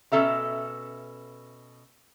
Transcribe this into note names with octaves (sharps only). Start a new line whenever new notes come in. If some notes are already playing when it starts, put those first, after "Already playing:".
B2 C#4 E4 A4 E5 A#5